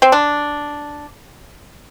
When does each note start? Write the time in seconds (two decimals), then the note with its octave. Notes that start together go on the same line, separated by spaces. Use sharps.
0.02 C4
0.12 D4